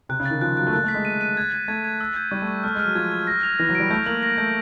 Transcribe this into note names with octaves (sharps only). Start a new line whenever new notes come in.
C3 F#6
C#3
D#3 A6
F3 F#6
F#3 F#6
A3
A#3 F#6
A3
B6
G#3
D#7
D#7
G#6
G#6
A3 G#6
G#6
E6
G6
G3 C#6
A3
C#6
A3 F6
G#3
F6
F#3
F3 G#6
G#6
A#6
F7
E3 A#6
F#3
G3 D7
A3 G6
A#3 F#7
A#6
A3 G6